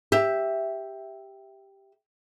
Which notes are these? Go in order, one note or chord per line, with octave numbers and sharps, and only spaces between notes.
G4 E5